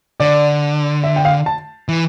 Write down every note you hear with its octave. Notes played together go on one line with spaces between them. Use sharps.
D3 D5
E5
G5
F5
A5
E3